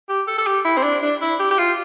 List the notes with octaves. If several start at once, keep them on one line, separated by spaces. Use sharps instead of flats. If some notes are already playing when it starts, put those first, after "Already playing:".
G4
A4
A4
G4
E4
C4
D4
D4
E4
G4
G4
F4